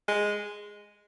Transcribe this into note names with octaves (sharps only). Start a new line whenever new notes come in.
G#3